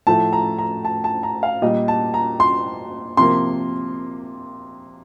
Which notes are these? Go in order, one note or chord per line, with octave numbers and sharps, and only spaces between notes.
A2 F3 A3 A5
A#5
A#5
A5
A5
A#5
F5
A#2 G3 A#3 D#5
A5
A#5
C6
C3 F3 A#3 C6